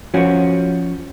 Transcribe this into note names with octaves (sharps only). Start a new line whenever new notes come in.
F3 C#4 F#4